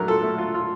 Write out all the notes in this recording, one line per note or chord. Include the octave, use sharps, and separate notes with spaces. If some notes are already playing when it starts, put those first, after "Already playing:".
Already playing: F#3 A3 D4 A#4
F4 A4
A3
F4
F4